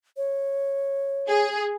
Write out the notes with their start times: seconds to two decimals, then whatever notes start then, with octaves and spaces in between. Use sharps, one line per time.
0.17 C#5
1.29 G#4